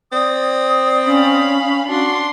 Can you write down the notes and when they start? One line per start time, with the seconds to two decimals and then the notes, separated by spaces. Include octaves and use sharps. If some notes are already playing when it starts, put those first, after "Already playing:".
0.12 C4 D5 D#6
1.06 C#4 F5 B5
1.88 D4 F#4 C6